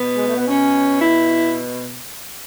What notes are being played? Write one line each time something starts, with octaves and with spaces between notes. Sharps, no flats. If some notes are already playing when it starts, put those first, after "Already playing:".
Already playing: B2 B3
G#3
A3
B3
C#4
E4